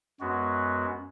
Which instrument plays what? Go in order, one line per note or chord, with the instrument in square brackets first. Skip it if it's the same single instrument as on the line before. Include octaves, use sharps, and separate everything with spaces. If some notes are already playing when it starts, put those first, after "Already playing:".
[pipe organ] F#2 G#3 B3 F#4